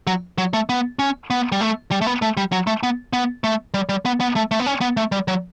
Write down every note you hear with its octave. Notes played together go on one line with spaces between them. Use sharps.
F#3
F#3
A3
B3
C#4
B3
G3
A3
G3
A3
B3
A3
G3
F#3
A3
B3
B3
A3
G3
G3
B3
B3
A3
A3
B3
C#4
B3
A3
G3
F#3